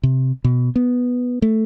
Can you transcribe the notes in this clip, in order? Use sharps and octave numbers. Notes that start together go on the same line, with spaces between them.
C3
B2
B3
A3